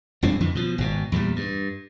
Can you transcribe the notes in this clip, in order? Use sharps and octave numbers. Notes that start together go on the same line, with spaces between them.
E1 G2 C4 D4
F2 D3 E3
B2 F3
G#1 B2
E2 A#2 F#3 G3
G2